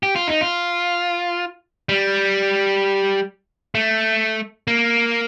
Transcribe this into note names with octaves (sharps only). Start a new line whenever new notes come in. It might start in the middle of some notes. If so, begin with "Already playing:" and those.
G4
F4
D#4
F4
G3
A3
A#3